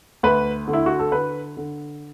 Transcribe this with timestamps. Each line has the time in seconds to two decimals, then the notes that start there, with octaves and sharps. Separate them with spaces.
0.23 D2 B4
0.68 D3
0.73 E4
0.86 F#4
0.99 A4
1.12 D3 B4
1.57 D3